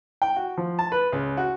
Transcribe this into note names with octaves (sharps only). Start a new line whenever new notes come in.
G5
F#4
F3
A5
B4
C#2
F#4